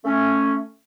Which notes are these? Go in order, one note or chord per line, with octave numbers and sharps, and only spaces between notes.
A3 C#4